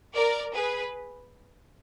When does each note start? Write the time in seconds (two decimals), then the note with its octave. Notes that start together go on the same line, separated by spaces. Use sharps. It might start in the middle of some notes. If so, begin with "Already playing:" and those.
0.14 A#4 D5
0.53 G#4 B4